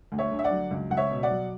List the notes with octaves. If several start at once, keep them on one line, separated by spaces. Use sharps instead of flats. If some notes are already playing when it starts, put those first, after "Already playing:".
D2
C#5 E5
D3
E5
D5 F#5
F#3
C#2
C#2 F#5
C#5 E5
B2
D5 F#5
F#3